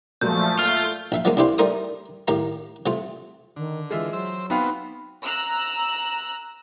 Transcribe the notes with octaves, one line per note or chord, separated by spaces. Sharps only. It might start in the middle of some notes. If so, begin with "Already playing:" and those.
A#2 F3 F#3 G#3 A3 G6
A3 F4 F6
A#1 E5 F5
F3 F#3 G#3 A#3 C#4
C2 D4 E4 G4 C5 F5
G3 A3 D#4 A#4 C5 D#6
A2 D#3 G4 F5 A#5
C3 A3 F4
D3 D#3
E3 G#3 F4 E5
F#3 C5 E6
B3 C4 D#4 F#4 B4 F5 G5 B5
A#5 E6 F#6